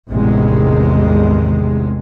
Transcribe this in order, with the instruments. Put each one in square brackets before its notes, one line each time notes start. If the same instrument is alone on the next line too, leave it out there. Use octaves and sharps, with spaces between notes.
[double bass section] A1 E2 C3 D#3 G#3